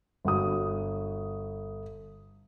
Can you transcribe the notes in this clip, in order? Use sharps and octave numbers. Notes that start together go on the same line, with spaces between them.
G1 F#4 D#6